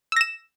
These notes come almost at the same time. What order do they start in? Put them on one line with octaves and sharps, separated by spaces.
E6 A#6 E7